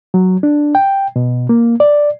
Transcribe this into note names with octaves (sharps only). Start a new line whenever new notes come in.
F#3
D4
G5
B2
A#3
D5